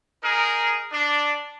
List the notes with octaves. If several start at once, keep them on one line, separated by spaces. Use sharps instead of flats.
D#4 G#4 A#4
D4